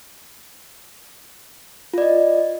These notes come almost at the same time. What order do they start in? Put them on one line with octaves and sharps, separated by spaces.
F4 D5 D#5